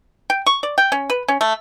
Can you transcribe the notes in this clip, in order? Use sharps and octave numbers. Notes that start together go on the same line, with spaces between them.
G5
C#6
D5
G5
C#4
B4
C#4
A3